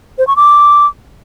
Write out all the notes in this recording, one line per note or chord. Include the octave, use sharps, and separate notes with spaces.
C5
C#6
D6